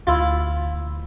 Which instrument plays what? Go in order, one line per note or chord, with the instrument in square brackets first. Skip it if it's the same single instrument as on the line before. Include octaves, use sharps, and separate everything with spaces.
[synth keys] D2 [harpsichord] E4 F4